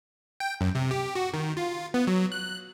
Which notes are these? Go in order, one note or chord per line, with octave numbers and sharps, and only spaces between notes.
G5
F#2
C3
G4
F#4
D#3
F4
B3
F#3
F#6